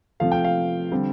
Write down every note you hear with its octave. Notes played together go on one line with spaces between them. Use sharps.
C3 F3 A3 F5
G5
F5
D3 G3 C4